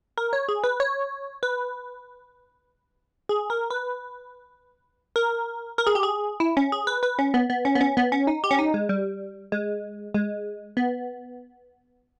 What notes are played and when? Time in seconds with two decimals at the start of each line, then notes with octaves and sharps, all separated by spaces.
0.18 A#4
0.33 C#5
0.49 G#4
0.64 B4
0.80 C#5
1.43 B4
3.29 G#4
3.50 A#4
3.70 B4
5.16 A#4
5.78 A#4
5.87 G#4
5.95 G4
6.03 G#4
6.40 E4
6.57 C#4
6.72 G#4
6.87 B4
7.03 B4
7.19 C#4
7.34 B3
7.50 B3
7.65 C#4
7.75 B3
7.81 C#4
7.97 B3
8.12 C#4
8.27 D#4
8.44 G4
8.51 C#4
8.59 D#4
8.74 G#3
8.89 G3
9.52 G#3
10.14 G#3
10.77 B3